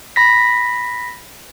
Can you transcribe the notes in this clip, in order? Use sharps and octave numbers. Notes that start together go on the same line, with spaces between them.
B5 A#6 B6